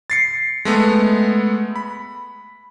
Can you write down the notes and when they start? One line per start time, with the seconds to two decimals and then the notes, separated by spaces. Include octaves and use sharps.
0.10 A6 C7 C#7
0.65 G#3 A3 B3
1.76 B5